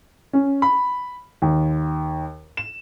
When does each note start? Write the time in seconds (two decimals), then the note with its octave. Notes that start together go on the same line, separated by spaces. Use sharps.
0.33 C#4
0.62 B5
1.42 D#2
2.57 E7